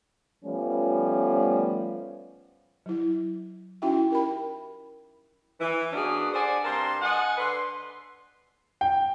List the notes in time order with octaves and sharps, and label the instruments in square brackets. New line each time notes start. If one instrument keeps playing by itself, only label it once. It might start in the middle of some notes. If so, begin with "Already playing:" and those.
[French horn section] F3 G3 A3 B3 C#4
[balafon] F#3 E4
C#4 D#4 E4 F#4 E5 G5
G4 A#4 G5 B5
[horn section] E3
A#3 B3 C#4 D4 F#4 G#4
G4 A4 C5 D5 F#5 G#5
G2 C4 A#4 A5 C6
D#5 F#5 G#5
D3 B4 C6
[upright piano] G5